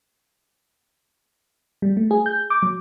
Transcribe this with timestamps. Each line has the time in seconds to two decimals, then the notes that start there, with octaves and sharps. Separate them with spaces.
1.82 G3
1.97 A3
2.11 G#4
2.26 G6
2.50 D6
2.63 F#3